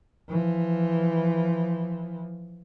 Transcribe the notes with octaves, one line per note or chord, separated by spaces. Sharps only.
E3 F3